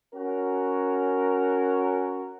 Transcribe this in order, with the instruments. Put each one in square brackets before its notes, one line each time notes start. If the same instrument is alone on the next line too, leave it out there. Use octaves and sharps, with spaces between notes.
[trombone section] C#4 F#4 A#4